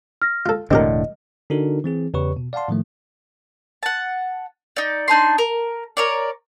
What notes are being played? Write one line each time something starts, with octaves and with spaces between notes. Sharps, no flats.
F6 A#6
F4 A4
E1 A2 D3 C4 G4 A#4 D#5
D3 D4 D#4 F#4 A4 A#4
E3 C4 G#4
E2 C#3 G4 B4 C#5 C#6
B2
D5 F5 F#5 A5 C6
A2 D#3 F3 A3
F#5 A5
D#4 D5
D4 D#4 A5 C6
A#4
A#4 C#5 D5